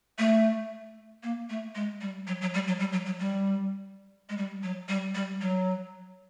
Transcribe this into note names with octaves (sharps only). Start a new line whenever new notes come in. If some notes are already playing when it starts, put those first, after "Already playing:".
A3
A#3
A3
G#3
G3
F#3
F#3
G3
F#3
G3
F#3
F#3
G3
G#3
G3
F#3
G3
G3
F#3